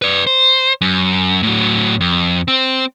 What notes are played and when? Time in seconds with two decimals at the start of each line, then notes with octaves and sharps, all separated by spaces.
0.02 B4 D5
0.27 C5
0.81 F#2
1.43 A2 F#3
2.00 F2
2.48 C4